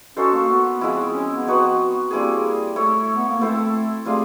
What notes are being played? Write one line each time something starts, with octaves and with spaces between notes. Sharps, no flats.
C#4 D#4 F#4 A4 C5
A#3
B3
F3 G#3 C4 E4
C#4
B3
C4 D#4 F#4 B4
G3 A#3 C4 E4 G#4
A3 E4 A4 C#5
B3
A#3
A3 C4 E4 A4 C5
G3 A3 C4 F4 G#4